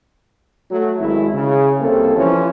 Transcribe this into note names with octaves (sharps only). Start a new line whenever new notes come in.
F#3 A3
G#1 E4
C#3
C2 A#3 C4 A4
E3 F3 C#4